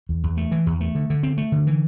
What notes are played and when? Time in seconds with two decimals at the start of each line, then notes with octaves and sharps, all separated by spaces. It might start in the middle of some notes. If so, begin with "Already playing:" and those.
0.09 E2
0.23 E2
0.37 A3
0.52 E3
0.66 E2
0.81 A3
0.95 D3
1.10 D3
1.23 C4
1.38 A3
1.52 D3
1.67 E3